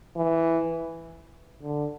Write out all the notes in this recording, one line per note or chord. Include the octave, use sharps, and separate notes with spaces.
E3
D3